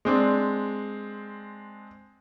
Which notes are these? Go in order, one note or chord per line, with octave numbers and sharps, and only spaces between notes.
G#3 C4 D4